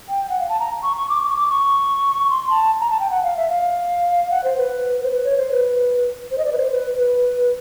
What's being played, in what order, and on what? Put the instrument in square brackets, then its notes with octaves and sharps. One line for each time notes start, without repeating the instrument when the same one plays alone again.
[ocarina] G5
F#5
F5
A5
A#5
C#6
C#6
D6
D6
C#6
D6
C#6
C6
A5
A#5
A5
G5
F#5
F5
E5
F5
F#5
C5
B4
C5
B4
C#5
C5
B4
C5
D#5
D5
B4
C5
B4
B4